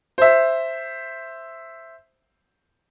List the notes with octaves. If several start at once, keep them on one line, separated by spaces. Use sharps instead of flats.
C5 E5